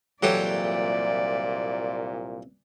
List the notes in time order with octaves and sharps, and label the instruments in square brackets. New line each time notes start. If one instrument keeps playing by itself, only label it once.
[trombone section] C2 A#2 [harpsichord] E3 F#3 G4 [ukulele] A4 C#5 [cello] D5